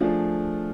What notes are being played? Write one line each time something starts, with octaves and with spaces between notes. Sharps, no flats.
F3 A3 D4 F4 G#4